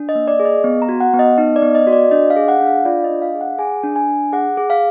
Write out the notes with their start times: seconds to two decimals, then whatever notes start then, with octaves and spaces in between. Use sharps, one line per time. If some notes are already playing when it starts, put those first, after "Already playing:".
Already playing: D4
0.09 D#5
0.15 A#3
0.28 D5
0.40 G#4
0.45 D#5
0.64 B3
0.82 A#5
0.89 F#4
1.00 F#5
1.13 B3
1.19 D#5
1.38 D#4 D#5
1.56 D5
1.62 B3
1.75 D#5
1.87 F#4
1.93 D5
2.11 D4 D#5
2.30 F5
2.36 G#4
2.48 F#5
2.60 D4
2.66 F5
2.85 F4 D5
3.04 D#5
3.10 D4
3.22 F5
3.35 G#4
3.41 F#5
3.58 G#4 G#5
3.83 D4
3.96 G#5
4.08 D4
4.33 G#4 F#5
4.57 G#4
4.70 F5